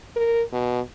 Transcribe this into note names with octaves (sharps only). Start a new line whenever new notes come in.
A#4
B2